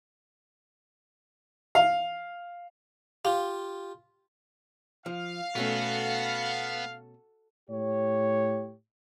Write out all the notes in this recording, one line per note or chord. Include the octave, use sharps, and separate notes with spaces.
F5
F4 G4 F5
F3 F5
B2 A3 B3 C#4 F#4 A4
A2 G4 C#5